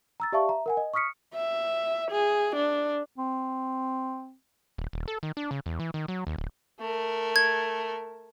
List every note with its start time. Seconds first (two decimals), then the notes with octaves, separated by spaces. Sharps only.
0.20 A#5 E6 A6
0.32 G4 D5 E5 F5 A5 C#6
0.49 E5 A#5
0.66 A#4 F#5 G#5
0.77 D#5
0.94 C#6 D#6 F6 B6 C#7
1.34 E5
2.11 G#4
2.56 D4
3.19 C4
4.78 D#1
4.93 D#1
5.08 A4
5.23 D#3
5.37 D4
5.51 C#3
5.66 E2
5.80 E3
5.94 D#3
6.08 F#3
6.27 D#2
6.38 D1
6.80 A3 A#4
7.36 G#6